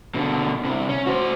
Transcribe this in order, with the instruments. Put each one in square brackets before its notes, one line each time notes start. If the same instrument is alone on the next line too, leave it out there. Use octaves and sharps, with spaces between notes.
[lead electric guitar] B2 D3
C2 C3
C#4
F#4 C5